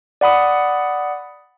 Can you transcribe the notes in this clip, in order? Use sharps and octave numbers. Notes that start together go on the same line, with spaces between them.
D5 F#5 B5 D#6